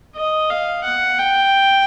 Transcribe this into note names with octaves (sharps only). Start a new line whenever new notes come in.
D#5
F5
F#5
G5